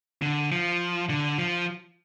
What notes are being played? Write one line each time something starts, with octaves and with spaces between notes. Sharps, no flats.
D3
F3
D3
F3